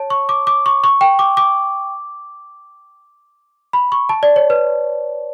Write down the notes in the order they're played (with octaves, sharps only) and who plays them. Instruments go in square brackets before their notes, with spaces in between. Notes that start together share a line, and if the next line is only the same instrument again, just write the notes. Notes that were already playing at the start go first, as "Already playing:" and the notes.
Already playing: [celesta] C#5 A5
C#6
D6
D6
C#6
C#6
G5
D6
D6
B5
C#6
A5
D5
C#5
B4